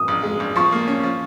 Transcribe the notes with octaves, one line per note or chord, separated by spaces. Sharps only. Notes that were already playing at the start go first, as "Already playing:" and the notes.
Already playing: D#6
A#1
G#3
A#1
F3 C#6
A#3
C#4
F3